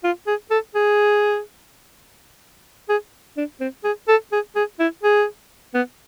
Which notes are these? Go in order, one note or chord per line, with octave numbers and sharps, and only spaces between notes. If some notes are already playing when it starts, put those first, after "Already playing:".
F4
G#4
A4
G#4
G#4
D4
C4
G#4
A4
G#4
G#4
E4
G#4
B3